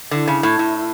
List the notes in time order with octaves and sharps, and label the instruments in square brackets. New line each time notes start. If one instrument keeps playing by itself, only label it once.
[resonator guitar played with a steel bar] D3 [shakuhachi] E4
[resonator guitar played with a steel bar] C#3
A2
A2